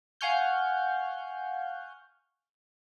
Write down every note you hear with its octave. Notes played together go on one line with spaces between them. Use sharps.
F5 F#5 G#5 C#6 F6 G6